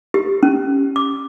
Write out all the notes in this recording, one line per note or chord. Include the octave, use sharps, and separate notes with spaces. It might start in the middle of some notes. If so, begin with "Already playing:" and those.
G4
C#4
D6